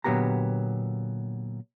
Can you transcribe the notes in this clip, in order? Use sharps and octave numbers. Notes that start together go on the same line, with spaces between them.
A#2 D3 F#3 B3 G4 A#5